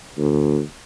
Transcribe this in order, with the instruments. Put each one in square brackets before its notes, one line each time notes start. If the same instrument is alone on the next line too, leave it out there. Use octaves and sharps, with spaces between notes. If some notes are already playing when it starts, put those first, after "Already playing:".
[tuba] D2